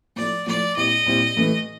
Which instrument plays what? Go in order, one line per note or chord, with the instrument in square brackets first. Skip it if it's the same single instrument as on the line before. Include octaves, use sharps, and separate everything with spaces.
[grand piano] A2 F3 A3 [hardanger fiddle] D5
[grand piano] A2 F3 A3 [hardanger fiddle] D5
[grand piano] A#2 G3 C4 E4 G4 [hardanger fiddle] D#5
[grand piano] A#2 G3 C4 E4 G4
A2 E3 A3